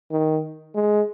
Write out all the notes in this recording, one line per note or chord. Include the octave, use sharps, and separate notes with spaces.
D#3
G#3